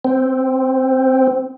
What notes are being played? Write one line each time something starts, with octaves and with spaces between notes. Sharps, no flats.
C4